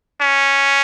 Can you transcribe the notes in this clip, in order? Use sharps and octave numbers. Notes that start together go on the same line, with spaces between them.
C#4